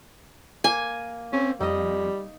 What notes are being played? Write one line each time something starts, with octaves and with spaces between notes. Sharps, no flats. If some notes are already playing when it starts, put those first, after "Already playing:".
A#3 G#5
C4 C#4
F2 G3 D#4 D#5